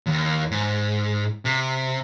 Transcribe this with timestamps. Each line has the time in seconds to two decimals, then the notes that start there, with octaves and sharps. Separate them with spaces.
0.06 D#2
0.51 G#2
1.45 C3